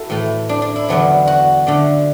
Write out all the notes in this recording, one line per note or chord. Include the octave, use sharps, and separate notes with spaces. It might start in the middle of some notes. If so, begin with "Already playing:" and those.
Already playing: E4 F#4 A4
A2 E3 A3
D4
D4
E4
E2 D3 F#3 B3 D4
F#4
D3 A3 D4